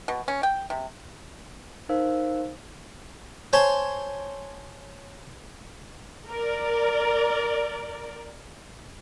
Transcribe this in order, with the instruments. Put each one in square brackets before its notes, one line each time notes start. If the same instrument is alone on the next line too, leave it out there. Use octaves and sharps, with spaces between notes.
[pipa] B2
C#4
G5
C3
[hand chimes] D#4 A#4 C5 F5 E6
[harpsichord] C5 C#5 G#5 A5 C6
[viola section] A#4 D5